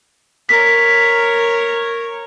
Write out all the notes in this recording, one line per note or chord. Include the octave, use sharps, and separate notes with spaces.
A#4 C#5 B6